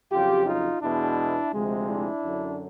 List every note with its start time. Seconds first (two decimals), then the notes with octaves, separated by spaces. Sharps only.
0.11 F2 C#3 F#3 F4 G4
0.46 D#4 F4
0.82 E2 B2 G#3 D4 E4
1.52 D2 C3 F3 G#3
1.87 D4 E4
2.23 F#2 D3 F#3